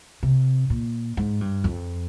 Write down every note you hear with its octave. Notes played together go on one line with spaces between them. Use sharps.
C3
A#2
G#2
G2
F2